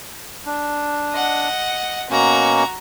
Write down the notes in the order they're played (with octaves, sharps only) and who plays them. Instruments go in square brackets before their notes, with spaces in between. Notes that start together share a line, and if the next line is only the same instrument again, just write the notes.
[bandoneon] D4
[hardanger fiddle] D#5 F#5
[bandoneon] B2 A#3 C#4 [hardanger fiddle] F#4 A#5